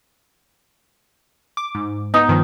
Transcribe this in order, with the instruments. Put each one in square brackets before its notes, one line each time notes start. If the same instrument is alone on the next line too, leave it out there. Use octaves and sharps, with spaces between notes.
[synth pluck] D6
G#2
[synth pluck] B3 [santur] D#4
[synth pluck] G2 D#3 F3